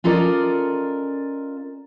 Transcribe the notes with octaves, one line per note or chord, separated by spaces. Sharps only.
C#4 F4 A4 A#4 D5 D#5